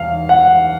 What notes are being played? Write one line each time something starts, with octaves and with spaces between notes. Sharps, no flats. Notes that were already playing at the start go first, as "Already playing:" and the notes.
Already playing: E2 F5
F#5